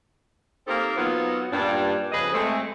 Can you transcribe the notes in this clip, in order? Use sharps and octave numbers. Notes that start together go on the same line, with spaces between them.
A#3 C4 D#4 G4 A4 A#4
F#3 B3 D#4 F4
G2 A#2 D4
F2 C#3 G#4 B4 D#5
G#3 A3 C4